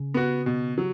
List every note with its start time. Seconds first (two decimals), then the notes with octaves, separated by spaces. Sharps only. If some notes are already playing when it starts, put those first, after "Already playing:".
Already playing: C#3
0.14 B3 F#4
0.46 B2
0.78 F#3